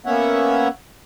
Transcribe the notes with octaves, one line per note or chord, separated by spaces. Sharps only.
A#3 B3 C#4 C#5 E5 F#5